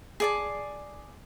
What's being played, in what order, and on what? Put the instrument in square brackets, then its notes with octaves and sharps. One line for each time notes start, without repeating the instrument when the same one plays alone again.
[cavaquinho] G#4 D5 A5